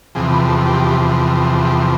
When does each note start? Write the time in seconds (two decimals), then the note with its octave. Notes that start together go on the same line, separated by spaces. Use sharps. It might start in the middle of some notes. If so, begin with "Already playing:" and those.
0.15 E2 C3 F3 G#4
0.33 B4
0.48 A4
0.66 G4
1.66 G4